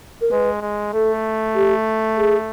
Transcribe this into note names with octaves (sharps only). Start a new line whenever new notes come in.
A#4
G#3 B4
G#3
A3 A4
G4
G#4